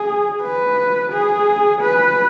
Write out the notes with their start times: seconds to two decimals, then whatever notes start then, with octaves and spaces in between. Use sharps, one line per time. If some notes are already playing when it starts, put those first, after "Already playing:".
Already playing: G#4
0.43 B4
1.13 G#4
1.82 B4